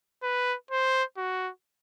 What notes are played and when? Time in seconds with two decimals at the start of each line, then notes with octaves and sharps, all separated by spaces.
0.23 B4
0.71 C5
1.17 F#4